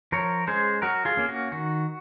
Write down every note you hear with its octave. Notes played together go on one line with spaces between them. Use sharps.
F3 A#4 C#5
G#3 C#4 G#4 C5
F#3 F#4 A#4
F4 G#4
A#3 C#4
F#4
D#3 F#4